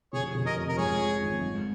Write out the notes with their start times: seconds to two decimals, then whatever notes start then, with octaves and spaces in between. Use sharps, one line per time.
0.13 F1 G#4 C#5
0.35 F1
0.46 A#4 D#5
0.56 F2
0.69 A#4
0.77 G#2 G#4 C#5
0.99 F3
1.21 G#1
1.42 G#2